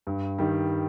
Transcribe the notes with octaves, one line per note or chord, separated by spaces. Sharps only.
G2
D#3 G3